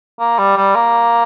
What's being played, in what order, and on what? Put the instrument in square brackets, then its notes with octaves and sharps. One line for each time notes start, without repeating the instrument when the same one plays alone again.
[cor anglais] A#3
G3
G3
A#3